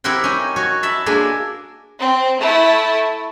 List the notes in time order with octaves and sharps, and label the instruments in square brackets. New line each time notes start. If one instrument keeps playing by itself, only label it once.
[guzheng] C4 E4 G4 A#4 C5 F#5
C#4 D#4
F#4 C#5
E5 A5 B5
G#3 A#3 D4 G#4
[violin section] C4
A3 E4